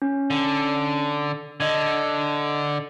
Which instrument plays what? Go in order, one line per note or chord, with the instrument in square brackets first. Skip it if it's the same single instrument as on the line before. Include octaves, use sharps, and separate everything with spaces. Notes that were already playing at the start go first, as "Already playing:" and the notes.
[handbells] C#4
[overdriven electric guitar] D3
[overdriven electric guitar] D3 [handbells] D#5 G#6